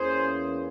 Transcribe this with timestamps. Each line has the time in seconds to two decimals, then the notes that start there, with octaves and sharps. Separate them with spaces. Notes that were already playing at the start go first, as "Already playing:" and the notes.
Already playing: E2 E3 A#3 C#4 G#4 C5